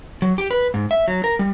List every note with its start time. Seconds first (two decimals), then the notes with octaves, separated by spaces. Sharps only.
0.22 F#3
0.38 G4
0.51 B4
0.74 G#2
0.91 E5
1.08 F#3
1.24 A#4
1.39 G3